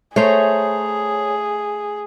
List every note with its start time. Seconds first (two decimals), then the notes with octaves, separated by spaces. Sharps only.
0.16 A3 G#4 C5 C#5 A#5